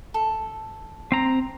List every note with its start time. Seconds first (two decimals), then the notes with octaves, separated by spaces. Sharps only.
0.14 A4
1.12 C4 A#5